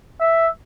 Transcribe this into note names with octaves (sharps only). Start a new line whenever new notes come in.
E5